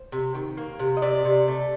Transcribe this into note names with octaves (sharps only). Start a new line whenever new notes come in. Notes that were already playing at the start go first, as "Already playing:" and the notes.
Already playing: C5
C3
D#3
A#3
C3
D#5
C3 D5
C3
A3